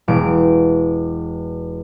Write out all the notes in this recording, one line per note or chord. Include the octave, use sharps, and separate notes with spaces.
E1 D7